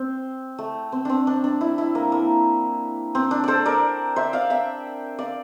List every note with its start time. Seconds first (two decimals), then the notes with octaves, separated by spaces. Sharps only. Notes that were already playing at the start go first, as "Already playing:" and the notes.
Already playing: C4
0.58 A3
0.92 C4
1.05 C4 D4
1.27 D4
1.44 D4
1.61 E4
1.78 E4
1.95 A#3
2.12 A#3
3.15 C4
3.31 D4
3.44 A4 C5 D5
3.66 A#4 D5
4.16 C5 E5
4.33 D5 F5
4.50 E5 G5
5.18 D5 F5